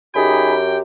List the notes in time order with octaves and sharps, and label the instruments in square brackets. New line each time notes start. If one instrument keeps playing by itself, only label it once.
[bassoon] F#2 [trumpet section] D#4 G#4 B5 [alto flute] G4 [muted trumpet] G5